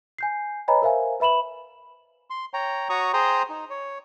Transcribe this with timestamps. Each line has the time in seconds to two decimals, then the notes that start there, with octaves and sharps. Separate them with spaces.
0.18 G#5 G6 C7
0.68 B4 C#5 D#5 G#5 A#5 B5
0.82 A#4 C5 E5 F5 G#5
1.20 B4 E5 B5 E7 F#7
2.30 C6
2.54 C#5 G5 A#5
2.89 F#4 C#5 A#5 C#6 D#6
3.13 G#4 C5 G5 A#5 C6 D#6
3.50 D#4
3.70 C#5